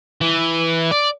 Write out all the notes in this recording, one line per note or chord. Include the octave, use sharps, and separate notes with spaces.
E3
D5